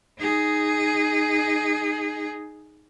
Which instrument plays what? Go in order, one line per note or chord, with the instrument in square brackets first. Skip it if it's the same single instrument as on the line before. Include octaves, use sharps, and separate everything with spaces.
[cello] D#4 G#4